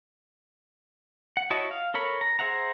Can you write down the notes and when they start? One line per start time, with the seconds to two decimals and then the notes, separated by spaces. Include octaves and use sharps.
1.37 F#5
1.50 E4 F#4 C#5 D#5 A5
1.71 F5
1.94 A4 A#4 C#5 B5
2.21 A#5
2.39 G#4 C5 E5 F#5 A#5